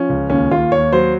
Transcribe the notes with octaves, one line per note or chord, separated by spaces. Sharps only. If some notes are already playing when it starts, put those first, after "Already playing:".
Already playing: F3 C#4
C#2
D#2 C#4
D#2 F4
D#2 C#5
F#3 C5